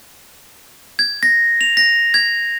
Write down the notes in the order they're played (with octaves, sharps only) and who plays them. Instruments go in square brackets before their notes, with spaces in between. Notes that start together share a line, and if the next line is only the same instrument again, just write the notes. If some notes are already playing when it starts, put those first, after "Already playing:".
[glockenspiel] G#6
A#6
F7
A#6
G#6